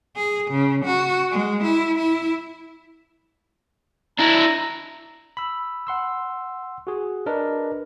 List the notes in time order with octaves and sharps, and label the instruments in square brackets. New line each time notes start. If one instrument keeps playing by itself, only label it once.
[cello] G#4
C#3
F#4
G#3
E4
E4
[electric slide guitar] D4 E4 [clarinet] A#5
[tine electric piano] B5 E6
F#5 C6 E6
F#4 G#4
D4 A#4 B4 D#5